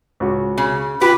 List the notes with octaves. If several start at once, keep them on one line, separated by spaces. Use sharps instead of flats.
C#2 F#4
C#3
F4 G4 B4